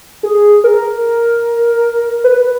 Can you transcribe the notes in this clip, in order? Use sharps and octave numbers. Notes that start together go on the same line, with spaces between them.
G#4
A#4
B4